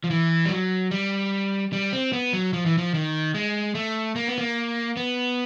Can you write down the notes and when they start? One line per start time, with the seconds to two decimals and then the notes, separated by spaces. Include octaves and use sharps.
0.04 F3
0.10 E3
0.45 G3
0.51 F#3
0.91 G3
1.73 G3
1.93 C4
2.13 B3
2.33 F#3
2.53 F3
2.66 E3
2.78 F3
2.94 D#3
3.35 G#3
3.75 A3
4.16 A#3
4.27 B3
4.39 A#3
4.97 B3